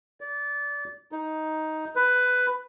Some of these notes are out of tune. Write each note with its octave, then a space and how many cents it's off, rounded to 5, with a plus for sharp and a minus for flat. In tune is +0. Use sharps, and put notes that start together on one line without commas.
D5 -25
D#4 +10
B4 +10